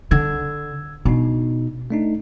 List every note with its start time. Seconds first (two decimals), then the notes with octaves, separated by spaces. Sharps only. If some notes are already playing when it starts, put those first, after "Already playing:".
0.11 D3 E6 G#6
1.05 B2 D4 D#4
1.90 A3 D4 D#4